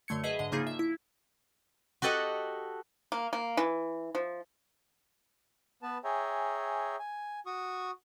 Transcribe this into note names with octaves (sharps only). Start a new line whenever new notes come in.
F#2 D3 A3 G#6 C#7
G#4 B4 D#5 E5
G#2 D3 D#5
C#3 F3 A#3 D#4 F4 G#4
E5
E4
F#4 G4 A4 D#5 F#5
A#3
A#3
E3
F3
B3 B4 A5
G#4 C#5 E5 G5 G#5 A#5
G#5
F#4 C#6 D#6